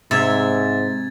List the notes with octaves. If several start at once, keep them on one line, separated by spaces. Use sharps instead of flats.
G#2 C3 E5 G#6 A6